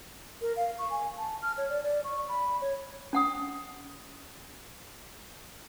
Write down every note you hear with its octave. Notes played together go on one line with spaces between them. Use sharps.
A#4
F5
C#6
G#5
A5
F6
C#5
D5
D5
C#6
B5
C#5
C#4 F#5 D#6